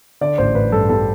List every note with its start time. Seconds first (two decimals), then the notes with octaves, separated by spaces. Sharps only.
0.21 D3 D5
0.38 A1 C5
0.55 A1 B4
0.72 G2 A4
0.89 G3 A4